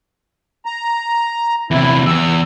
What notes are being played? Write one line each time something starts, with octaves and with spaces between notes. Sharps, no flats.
A#5
E2 C3 E4
E2 E6